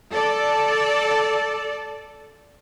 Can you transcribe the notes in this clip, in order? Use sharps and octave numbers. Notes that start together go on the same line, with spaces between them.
A4 D5